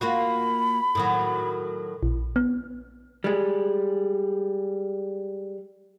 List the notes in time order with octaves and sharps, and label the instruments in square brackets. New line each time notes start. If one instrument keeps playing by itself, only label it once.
[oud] A#3 F4 F#4 [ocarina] B5
[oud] A2 D#3 F#3
[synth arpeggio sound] A#1
B3
[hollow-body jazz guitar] G3 G#3